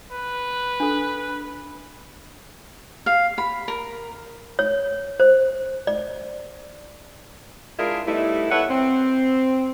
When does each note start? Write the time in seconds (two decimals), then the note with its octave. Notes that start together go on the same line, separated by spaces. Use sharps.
0.12 B4
0.80 D4 A4
3.06 F5
3.38 B5
3.68 A#4
4.59 C#5
5.20 C5
5.87 D5
7.79 G#3 D4 E4 F4 G#4 A#4
8.07 G3 A3 B3 D#4 E4
8.51 A4 B4 C#5 E5 F#5
8.70 C4